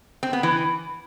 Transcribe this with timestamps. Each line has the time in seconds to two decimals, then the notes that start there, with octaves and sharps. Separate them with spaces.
0.23 C4
0.33 B3
0.43 E3